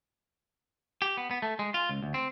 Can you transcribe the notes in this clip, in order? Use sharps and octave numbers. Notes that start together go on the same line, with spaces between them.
G4
B3
B3
A3
G#3
F4
C#2
D2
C4